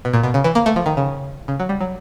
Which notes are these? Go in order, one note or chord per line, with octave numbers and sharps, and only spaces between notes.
B2
A#2
B2
C#3
E3
A#3
A3
F3
D#3
C#3
C#3
F#3
G3
F#3